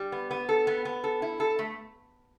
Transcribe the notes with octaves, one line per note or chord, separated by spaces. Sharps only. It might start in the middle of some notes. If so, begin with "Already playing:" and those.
Already playing: G3
B3
B3
A4
B3
B3
A4
E4
A4
A3